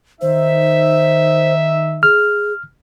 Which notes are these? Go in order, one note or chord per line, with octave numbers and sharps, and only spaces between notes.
D#3 D#4 C5 E5
G#4 F6